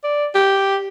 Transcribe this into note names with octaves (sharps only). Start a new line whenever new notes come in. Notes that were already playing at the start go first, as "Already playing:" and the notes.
D5
G4